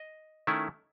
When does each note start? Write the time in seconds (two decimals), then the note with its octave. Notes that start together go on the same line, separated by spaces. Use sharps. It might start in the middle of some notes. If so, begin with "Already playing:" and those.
Already playing: D#5
0.47 D#3 A3 C#4 E4